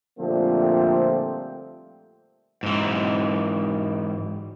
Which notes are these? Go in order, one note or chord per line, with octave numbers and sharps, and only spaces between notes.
A#2 D3 F3 G3 A3 C4
G#2 E3